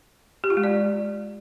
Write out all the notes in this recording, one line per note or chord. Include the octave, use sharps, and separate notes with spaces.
G4
F4
G#3
D5